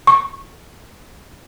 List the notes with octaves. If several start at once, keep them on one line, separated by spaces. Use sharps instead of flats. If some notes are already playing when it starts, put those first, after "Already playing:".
C#6